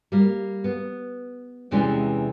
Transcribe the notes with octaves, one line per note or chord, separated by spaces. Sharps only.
G3 A#3
B3
E2 C3 E3 G#3 C#4 D5